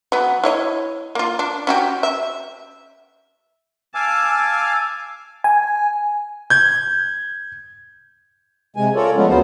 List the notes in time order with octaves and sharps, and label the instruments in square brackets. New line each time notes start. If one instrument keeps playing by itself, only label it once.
[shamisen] F#3 B3
E4 C#5 D#5
A#3 F4
D4
C#4 F#4 G4
E5
[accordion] F5 G#5 D6 [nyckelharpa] A5 [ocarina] E6
[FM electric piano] G#5
[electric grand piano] G6 G#6
[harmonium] C3 G#3 G#5
F4 A4 A#4 C#5 D5
F3 G#3 A3 B3 C#4 F4
D2 F#3 B3 C5